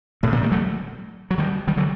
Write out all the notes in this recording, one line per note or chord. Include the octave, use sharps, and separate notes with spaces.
A2 C3
A#2 D3
D#3 G3
F#3 A3
F#3
D#3 G3
D#3 G3
D3 F#3